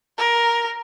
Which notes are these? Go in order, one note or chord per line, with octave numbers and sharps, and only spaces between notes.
A#4